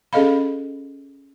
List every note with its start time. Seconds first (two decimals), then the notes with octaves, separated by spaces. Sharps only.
0.13 C#4 G#4 A4 D#5 F5 B5